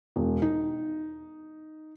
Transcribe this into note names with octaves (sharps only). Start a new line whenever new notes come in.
E1
D#4